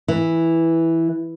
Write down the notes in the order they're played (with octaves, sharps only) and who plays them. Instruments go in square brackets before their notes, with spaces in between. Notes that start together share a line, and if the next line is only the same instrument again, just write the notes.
[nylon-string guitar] E3